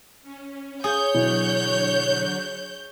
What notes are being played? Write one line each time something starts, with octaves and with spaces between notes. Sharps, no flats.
C#4
G#4 C#5 G6
B2 D3 E3 F#3 F#6